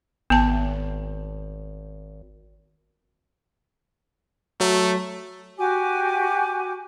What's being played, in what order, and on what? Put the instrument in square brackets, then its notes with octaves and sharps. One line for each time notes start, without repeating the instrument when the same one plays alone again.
[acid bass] G#1 [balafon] B3 A5
[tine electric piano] F#3 [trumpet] A3
[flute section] F#4 G4 G#5 D6